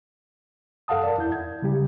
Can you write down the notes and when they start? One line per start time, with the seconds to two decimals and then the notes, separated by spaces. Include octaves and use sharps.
0.88 F#2 A4 F5 F#5 A5 D#6
1.01 A#4 D5 A5
1.16 E2 E4 G6
1.32 G#6
1.62 C#3 G3 G4